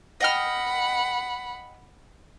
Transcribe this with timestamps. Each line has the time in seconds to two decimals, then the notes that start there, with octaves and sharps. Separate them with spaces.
0.21 D#5 F#5 G5 B5 F6